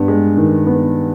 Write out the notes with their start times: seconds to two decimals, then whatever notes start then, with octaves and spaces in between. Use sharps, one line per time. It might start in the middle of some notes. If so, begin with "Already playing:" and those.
Already playing: G2 B3
0.08 G#3
0.37 D#3
0.67 B3